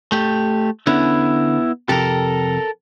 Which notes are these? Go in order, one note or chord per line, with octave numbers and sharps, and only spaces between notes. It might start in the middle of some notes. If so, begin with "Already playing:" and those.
A3 G4
D3 B3 C#4 E4
F2 C3 G4 A4 A#4